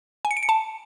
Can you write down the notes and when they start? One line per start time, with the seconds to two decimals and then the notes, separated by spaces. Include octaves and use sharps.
0.25 G#5
0.31 C#7
0.37 D7
0.43 C#7
0.49 A5